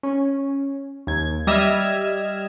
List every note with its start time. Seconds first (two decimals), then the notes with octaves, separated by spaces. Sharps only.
0.03 C#4
1.07 D#2 G#6
1.47 G3 D#5 E5 F6 G#6 E7